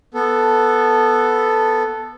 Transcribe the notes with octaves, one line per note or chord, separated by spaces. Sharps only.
B3 A4